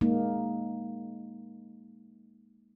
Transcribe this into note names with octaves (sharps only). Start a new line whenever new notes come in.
G#3 A#3 D#4